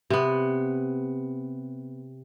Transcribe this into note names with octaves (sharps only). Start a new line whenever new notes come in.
C3 B3